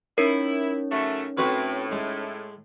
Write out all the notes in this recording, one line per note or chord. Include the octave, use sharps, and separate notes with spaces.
C#4 D#4 E4 A#4 C#5
C#3 F#3 A3
A2 C4 F#4 B4
G#3